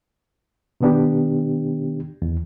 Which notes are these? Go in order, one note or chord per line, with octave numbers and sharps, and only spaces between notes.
B2 D#3 B3 D4 G4
E2